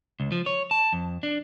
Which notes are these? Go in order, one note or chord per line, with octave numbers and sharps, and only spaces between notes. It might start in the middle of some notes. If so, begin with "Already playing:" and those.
C#2
F3
C#5
A5
F2
D4